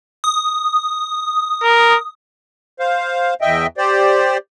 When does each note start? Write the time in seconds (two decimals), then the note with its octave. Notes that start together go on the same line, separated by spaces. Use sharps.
0.24 D#6
1.63 A#4
2.79 C5 F5
3.41 E2 D#5 E5 G5
3.78 G4 C5 D5